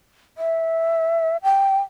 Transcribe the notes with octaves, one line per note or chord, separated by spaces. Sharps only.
E5
G5